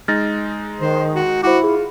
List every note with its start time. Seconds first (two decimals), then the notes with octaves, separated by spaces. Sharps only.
0.08 G#3 D#4 F6 A6 A#6
0.80 D#3 C5
1.15 F#4
1.43 E4 F#4 C5 F#5 D6
1.64 F4 G#4